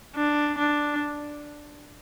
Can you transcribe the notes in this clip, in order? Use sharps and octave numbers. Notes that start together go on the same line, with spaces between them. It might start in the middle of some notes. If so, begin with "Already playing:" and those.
D4
D4